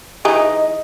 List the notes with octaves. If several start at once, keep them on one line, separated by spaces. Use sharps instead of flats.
E3 D#4 G#4 D#5